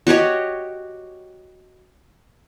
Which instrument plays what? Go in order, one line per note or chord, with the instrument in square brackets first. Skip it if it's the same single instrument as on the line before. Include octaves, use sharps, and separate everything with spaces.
[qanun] F#4 G4 C#5 D#5